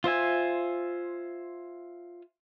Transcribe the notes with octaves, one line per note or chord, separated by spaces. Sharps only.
F4 C5 E5 G#5